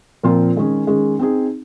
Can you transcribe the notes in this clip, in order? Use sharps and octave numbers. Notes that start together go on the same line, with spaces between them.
A#2 F3 C4 F4 A#4
D#3 G#3 C#4 G#4
D#3 G#3 C#4 G#4
C4 D#4 G#4